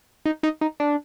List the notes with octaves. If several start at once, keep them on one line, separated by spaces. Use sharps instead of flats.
D#4
D#4
D#4
D4